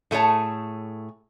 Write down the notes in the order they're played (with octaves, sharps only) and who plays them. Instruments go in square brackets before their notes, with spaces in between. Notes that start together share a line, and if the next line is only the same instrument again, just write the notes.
[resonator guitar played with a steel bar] A2 A3 G#4 C#5 A5